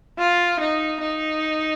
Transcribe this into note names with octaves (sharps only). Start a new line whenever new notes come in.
F4
D#4
D#4